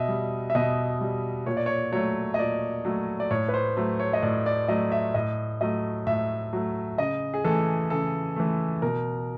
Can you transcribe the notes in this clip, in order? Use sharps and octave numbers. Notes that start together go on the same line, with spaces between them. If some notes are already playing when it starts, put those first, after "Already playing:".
Already playing: B2 D#5 E5
G3
E5
B2 D#5
G3
A#2 C#5
D5
C#5
F#3 A3 C#5
D#5
A#2 D5
F#3 A3
D5
A2 C#5
B4
C5
F#3 A3
C#5
D#5
A2 D5
D5
F#3 A3 D#5
E5
A2 D#5
F#3 A3 D#5
A2 E5
F#3 A3
C#3 D#5
G#4
E3 A3 A4
C#3 A4
E3 A3
B2 A#4